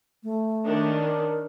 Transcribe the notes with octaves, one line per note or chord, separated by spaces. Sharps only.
A3
D#3 C#4 D4
A#4